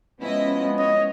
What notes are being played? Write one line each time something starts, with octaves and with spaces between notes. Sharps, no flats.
F3 G#3 B3 C#4 E4 D#5
C#5 D#5